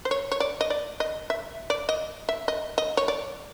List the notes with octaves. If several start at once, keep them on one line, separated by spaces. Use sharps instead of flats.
C5
C#5
C#5
D5
D#5
D5
D#5
E5
D5
D#5
E5
D#5
D#5
C#5
D5